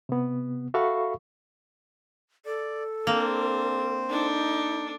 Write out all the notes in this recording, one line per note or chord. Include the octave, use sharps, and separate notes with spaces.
C3 B3
F#4 A4 E5 F5 B5 C#6
A4 D5
A#3 C4 D4 C5
D4 D#4 A4